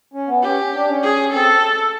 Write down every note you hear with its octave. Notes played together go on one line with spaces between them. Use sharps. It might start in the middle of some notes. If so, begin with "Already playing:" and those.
C#4
B3
C#4 G4
D4
C#4
G#4
C4 A4